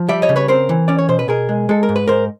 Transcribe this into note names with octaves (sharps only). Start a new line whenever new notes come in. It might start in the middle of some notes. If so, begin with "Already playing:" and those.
Already playing: F3
G3 D5 E5
C#5 D#5
C#3
B4 C#5
C4 A#4 C5
E3
C#4 D5
C#5
B2 C5
B4
B2 G#4 A#4
G#3
G#3 A4
A#4
G#2
B4
G#2 A#4 C5